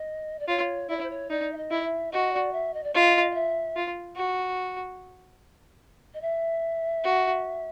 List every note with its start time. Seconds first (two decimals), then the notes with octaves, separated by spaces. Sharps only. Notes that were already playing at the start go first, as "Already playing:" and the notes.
Already playing: D#5
0.39 D5
0.48 F4 C#5
0.89 E4 D5
0.97 C#5
1.03 C5
1.10 C#5
1.30 D#4 D5
1.52 E5
1.57 D#5
1.71 E4
1.84 E5
2.12 F#4 D#5
2.33 D5
2.53 E5
2.74 D#5
2.83 D5
2.94 F4 D#5
3.31 D#5
3.34 E5
3.76 F4
4.16 F#4
6.14 D#5
6.21 E5
7.04 F#4